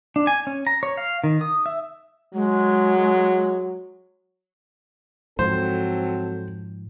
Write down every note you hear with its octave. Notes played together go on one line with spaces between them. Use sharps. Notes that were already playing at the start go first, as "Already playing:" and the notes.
D4
G#5
C#4
A#5
C#5
F5
D#3
D#6
E5
F#3 G#3
G#2 F3 F#3 C4 A4 C5